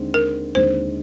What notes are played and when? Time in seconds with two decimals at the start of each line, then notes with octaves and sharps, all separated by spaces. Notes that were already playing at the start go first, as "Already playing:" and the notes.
Already playing: D#2 D3 G#3 C4
0.14 A#4
0.55 D#2 D3 G#3 C4 C5